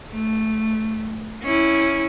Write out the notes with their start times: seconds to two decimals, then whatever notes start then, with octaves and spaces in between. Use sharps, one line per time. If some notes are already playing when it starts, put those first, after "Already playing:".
0.12 A3
1.42 C#4 E4